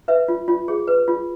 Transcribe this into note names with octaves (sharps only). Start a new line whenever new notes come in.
B4 E5
F4
F4
G#4
B4
F4